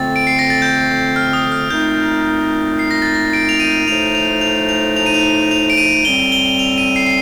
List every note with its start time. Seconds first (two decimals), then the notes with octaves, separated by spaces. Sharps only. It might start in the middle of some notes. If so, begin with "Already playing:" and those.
Already playing: F2 D3 A3 C4 A6
0.16 D7
0.27 C7
0.39 A#6
0.50 A6
0.62 G6
1.16 F6
1.33 D#6
1.52 F6
1.70 A#2 A3 C4 D#4 G6
2.79 C7
2.91 A#6
3.02 A6
3.14 A#6
3.33 D7
3.49 F7
3.60 D#7
3.88 A2 F3 A3 D#4 F7
4.15 F7
4.41 F7
4.69 F7
4.96 F7
5.06 D#7
5.14 F7
5.51 F7
5.70 D7
5.78 D#7
6.05 A2 G3 C4 G7
6.32 G7
6.59 F7
6.78 D#7
6.96 C7
7.06 C7